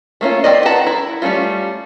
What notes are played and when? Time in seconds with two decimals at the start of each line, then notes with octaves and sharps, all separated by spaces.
0.21 A3 A#3 C#4 F4
0.44 C4 D#4 E4 D5 D#5
0.65 B4 F#5 A5 A#5
0.86 E4 A#5
1.22 G3 A3 C4 C#4 F4